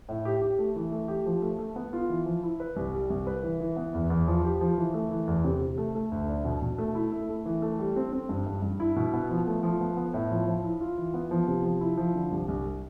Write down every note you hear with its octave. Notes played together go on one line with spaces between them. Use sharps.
A2
G4
G4
A3
E3
A3
G4
F3
A3
A3
B3
F4
E3
F3
E4
B4
C2
G3
C2
B4
E3
E3
B3
E2
E2
F3
G4
F3
E3
A3
E3
E2
C3
C3
A3
A3
D2
D4
B2
B2
A3
E4
A3
A3
E3
A3
G3
C4
C4
G2
G2
G2
E4
B2
B3
F3
A3
F3
B3
B3
A2
F3
F3
E4
F4
E3
B3
F3
C3
F3
E4
F3
D3
C2
C2